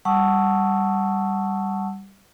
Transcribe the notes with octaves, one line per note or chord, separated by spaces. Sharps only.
G3 F#5 A5 C#6 D#6 E6